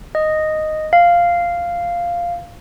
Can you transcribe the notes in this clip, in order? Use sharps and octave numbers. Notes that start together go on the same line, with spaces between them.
D#5
F5